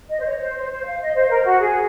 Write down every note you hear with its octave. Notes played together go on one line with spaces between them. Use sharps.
D#5
C5
C#5
C5
C5
C5
F5
D#5
C5
A#4
F#4
G#4